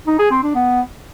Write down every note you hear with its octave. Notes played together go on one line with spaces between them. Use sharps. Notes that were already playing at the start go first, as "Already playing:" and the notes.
D#4
G#4
C4
D4
B3